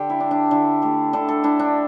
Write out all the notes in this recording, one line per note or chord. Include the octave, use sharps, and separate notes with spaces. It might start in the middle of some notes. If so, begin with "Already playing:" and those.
Already playing: D3 G4
E4
D4
D4
D3 E4
A3 G4
D3 A4
A4
D4 E4
D4